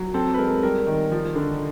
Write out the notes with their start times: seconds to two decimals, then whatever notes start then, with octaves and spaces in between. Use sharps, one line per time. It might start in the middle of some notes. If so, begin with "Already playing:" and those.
Already playing: F#3
0.14 C4 A4
0.34 B4
0.38 G#3 A#4
0.63 G3 A#4
0.87 D#3
1.12 F3
1.36 D3